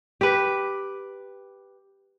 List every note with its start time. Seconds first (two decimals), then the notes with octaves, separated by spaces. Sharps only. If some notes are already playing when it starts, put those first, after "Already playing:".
0.21 G4 B4